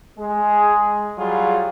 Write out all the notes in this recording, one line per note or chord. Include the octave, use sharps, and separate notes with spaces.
G#3 G#4
F#3 G3 F4 G#4